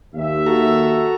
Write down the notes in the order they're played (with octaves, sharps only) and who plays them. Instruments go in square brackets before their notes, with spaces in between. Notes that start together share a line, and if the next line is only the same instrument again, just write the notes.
[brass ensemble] D#2 E5
[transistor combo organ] F#4 A4 A#5